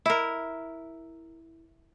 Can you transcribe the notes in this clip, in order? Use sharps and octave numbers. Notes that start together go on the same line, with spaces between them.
E4 A#4